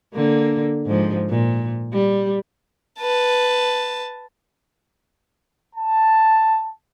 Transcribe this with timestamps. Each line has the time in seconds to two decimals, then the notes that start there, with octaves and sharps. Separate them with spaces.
0.14 D3 A#3
0.86 G#2 F3
1.30 A#2
1.93 G3
3.00 B4 A5
5.76 A5